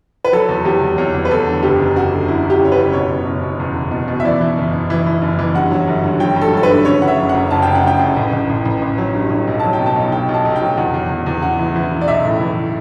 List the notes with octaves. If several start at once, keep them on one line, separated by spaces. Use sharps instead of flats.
B4
F#3 A4
E2
E2 G4
E2
E2 C#5
E2
B4
E2 A4
D3
F#1 G4
F#2
F#2 F#4
D3
F#1 E4
F#2
G4
F#1 C#5
B4
F#1
B2 C#5
F#1
F#1
B2
E2
F#1
B2
B2
E5
E3 D5
E3
F#1
F#1
E3
E3
F#1
E3
G2 F#5
F#3
G1
G2
F#3 G5
G2
A4
G2 A4
B4
D3
C#3 C#5
F#3 F#5
E5
F#1
F#5
F#2
F#1 A5
F#2 G5
F#5
C#3 G5
F#2
A1
A1
A1
A1
A1
F#3
G2
A1
B1
F#3 A5
G5
B2
A5
B1
B1 G5
B1
A5
B1
G5
F#3
E2 F#5
E2
E2
E2
C#3 F#5
E3
E3
C#3
D5
B1 E5
A2
E3